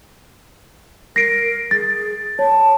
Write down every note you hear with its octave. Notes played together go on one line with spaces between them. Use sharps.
A#4 A#6 C7 D7
G#4 A6
C#5 A5